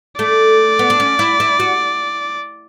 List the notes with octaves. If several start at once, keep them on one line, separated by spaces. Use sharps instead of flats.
A3 D5
B3
D4
C#4
E4
E4
F#4